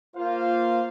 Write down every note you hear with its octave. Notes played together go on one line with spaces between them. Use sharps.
A#3 F4 C5 F5